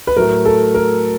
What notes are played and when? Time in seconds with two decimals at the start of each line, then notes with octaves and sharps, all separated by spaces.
0.07 B4
0.16 A2 F#3 A3 A#4
0.45 A4
0.74 A#4